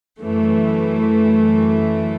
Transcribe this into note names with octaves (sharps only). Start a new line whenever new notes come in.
F#2 E3 A3